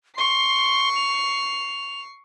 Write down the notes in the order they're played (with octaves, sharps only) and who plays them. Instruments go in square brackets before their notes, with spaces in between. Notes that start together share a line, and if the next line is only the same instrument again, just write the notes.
[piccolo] C6 [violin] C#6 C7
[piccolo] F7